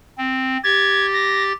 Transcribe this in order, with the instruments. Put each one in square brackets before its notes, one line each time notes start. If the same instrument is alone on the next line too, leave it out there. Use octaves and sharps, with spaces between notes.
[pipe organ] C4
[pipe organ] G4 A6 [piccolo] G#6
[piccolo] A#6